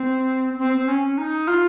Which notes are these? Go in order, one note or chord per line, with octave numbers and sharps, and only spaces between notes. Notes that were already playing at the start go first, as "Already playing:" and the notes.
Already playing: C4
C4
C4
C#4
D#4
F4